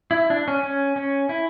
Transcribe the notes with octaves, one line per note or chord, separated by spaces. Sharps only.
E4
D4
C#4
C#4
C#4
E4